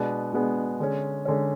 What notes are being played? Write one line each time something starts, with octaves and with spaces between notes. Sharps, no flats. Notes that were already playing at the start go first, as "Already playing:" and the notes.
Already playing: B2 G#3 B3 D4
B2 G#3 B3 D4
D3 G#3 C#4
D3 G#3 C#4